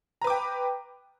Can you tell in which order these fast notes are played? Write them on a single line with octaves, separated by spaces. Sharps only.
A#5 B4 D6 G5